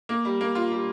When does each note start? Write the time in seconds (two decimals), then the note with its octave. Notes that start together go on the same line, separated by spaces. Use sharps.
0.09 A#3
0.25 G3
0.41 A#3
0.55 F4
0.72 G3